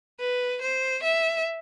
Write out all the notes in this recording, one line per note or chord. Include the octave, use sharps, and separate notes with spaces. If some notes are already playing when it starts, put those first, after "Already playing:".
B4
C5
E5